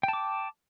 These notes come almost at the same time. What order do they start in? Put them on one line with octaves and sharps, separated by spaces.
G5 A5 D6